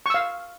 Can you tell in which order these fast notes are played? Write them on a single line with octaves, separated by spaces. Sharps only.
C#6 E6 F5